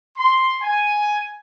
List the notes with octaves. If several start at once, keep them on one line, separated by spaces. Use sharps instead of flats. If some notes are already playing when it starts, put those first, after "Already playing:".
C6
G#5